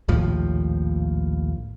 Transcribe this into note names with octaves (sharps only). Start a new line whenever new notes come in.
A#1 D#2 A2 F3